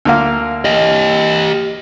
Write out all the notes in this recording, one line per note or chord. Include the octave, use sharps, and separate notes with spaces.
D2 A#3 F5
G4 D#5